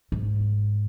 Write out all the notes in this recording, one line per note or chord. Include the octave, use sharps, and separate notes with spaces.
G#2